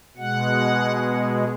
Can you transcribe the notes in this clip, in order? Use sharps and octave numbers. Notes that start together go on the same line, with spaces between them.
B2 G#3 F#5